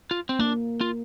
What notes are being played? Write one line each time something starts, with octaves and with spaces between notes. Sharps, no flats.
F4
C4
A#3 D4
F4